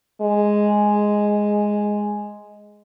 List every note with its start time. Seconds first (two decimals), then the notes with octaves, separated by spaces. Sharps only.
0.22 G#3